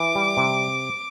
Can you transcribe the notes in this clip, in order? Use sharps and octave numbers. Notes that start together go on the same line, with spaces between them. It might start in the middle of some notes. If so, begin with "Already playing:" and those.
Already playing: E3 D6
G3
C3